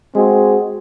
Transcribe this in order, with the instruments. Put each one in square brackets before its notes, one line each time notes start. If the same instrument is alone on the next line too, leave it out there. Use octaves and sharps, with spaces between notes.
[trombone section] G#3 C4 F#4